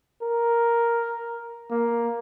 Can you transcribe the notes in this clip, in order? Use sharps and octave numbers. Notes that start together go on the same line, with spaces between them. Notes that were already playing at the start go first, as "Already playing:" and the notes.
A#4
A#3